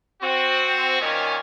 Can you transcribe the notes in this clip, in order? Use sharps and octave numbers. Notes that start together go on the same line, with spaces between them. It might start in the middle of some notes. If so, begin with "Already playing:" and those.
C4 F#4
A#2 D#3 C#4